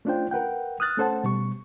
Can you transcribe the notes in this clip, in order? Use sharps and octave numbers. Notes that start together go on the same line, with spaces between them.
A3 C#4 D4 F4 C5 G5
A#4 B4 F#5 G5
D#6 F6 F#6 A6
A3 C#4 A4 C5 F#5 A5
B2 G3 C#6